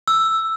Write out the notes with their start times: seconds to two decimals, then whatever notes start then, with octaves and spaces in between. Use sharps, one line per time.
0.08 E6